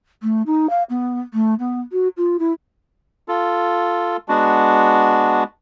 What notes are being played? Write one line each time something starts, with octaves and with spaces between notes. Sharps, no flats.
A3
D#4
F5
B3
A3
B3
F#4
F4
E4
F4 A4
G#3 B3 D4 F#4